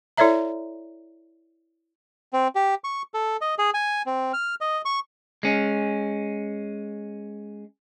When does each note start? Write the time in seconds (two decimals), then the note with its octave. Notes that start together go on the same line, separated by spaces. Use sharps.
0.17 E4 A4 C#5 D5 E5 A#5
2.33 C4
2.55 G4
2.84 C#6
3.14 A4
3.41 D#5
3.58 G#4
3.74 G#5
4.06 C4
4.33 F6
4.61 D#5
4.85 C#6
5.43 G#3 C#4